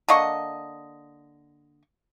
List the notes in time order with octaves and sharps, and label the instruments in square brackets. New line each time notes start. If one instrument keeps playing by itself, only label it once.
[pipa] D3 A#3 D#5 C#6